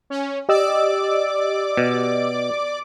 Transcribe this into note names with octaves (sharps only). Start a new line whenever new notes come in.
C#4
G4 D5 D#5 D6 E6
B2